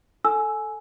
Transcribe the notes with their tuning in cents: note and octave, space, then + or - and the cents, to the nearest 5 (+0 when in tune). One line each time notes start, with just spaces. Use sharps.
A4 +0 G#5 +15 E6 +0